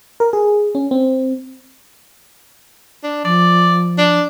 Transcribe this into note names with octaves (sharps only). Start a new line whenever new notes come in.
A#4
G#4
C#4
C4
D4
F3 D5
D4